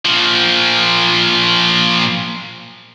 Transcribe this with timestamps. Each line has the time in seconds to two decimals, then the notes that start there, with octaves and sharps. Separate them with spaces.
0.05 A#2 F3